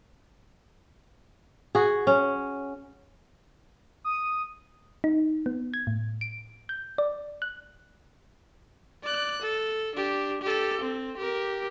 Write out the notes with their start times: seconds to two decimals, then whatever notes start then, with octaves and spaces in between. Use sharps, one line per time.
1.75 F#4 G#4
2.07 C#4
4.04 D#6
5.04 D#4
5.46 B3
5.74 G#6
5.87 A2
6.21 D7
6.69 G6
6.98 D5
7.42 F#6
9.03 D5 F#6
9.42 A4
9.96 D4 G4
10.42 G4 A4
10.82 C4
11.18 G4 A#4